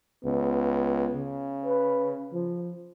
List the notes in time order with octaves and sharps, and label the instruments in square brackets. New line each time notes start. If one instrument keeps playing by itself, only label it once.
[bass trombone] C#2 [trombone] B3
[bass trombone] C#3
[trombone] B4
F3